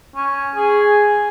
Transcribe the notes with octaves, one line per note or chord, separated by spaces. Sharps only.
C#4
G#4